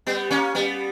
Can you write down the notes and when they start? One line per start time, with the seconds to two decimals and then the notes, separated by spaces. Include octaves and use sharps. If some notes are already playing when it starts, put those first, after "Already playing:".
0.07 G3 B3
0.31 A#3 C#4
0.55 G3 B3